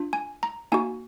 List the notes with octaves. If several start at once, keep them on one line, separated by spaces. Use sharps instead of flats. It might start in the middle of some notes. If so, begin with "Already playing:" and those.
Already playing: D4 F4
G#5
A#5
A#3 D#4 F#4 G#5